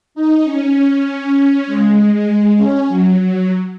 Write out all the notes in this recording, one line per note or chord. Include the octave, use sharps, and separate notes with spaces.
D#4
C#4
G#3
G#3
C#4
F#3
F#3